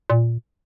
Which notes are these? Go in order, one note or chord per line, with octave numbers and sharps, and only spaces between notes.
A#2